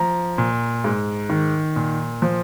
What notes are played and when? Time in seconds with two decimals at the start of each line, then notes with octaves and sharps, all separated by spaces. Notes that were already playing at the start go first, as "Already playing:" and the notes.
Already playing: F3 A#5
0.38 A#2
0.84 G#2
1.30 D#3
1.76 A#2
2.22 F3